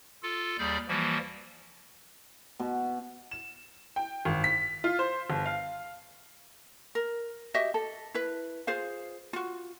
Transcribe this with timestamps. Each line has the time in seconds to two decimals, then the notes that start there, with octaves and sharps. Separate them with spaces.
0.23 F4 A4
0.59 D#2 G3 G#4 D5 G6
0.88 E3 F3 G3 A#3 F#4
2.60 B2
3.31 E7
3.96 G5
4.25 G#1
4.44 B6
4.84 F4
4.99 C5
5.30 G1
5.46 F5
6.95 A#4
7.54 F#4 G4 D#5 E5
7.74 A4
8.14 E4 B4
8.67 F4 G#4 C5 F5
9.33 F4 F#4